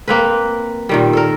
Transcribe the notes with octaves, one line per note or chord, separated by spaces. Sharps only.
A#3 C4 B4
A#2 D#3 G3
A4 A#4